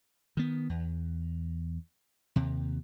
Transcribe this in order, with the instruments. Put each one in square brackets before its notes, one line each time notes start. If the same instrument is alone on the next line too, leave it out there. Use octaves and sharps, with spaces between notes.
[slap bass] D#3 B3
E2
D#2 C3